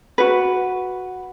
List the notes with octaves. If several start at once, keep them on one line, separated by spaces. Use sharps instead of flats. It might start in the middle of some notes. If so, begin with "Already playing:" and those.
F#4 B4